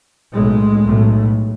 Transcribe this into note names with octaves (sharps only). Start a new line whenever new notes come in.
B1 A2 G#3
B1 A2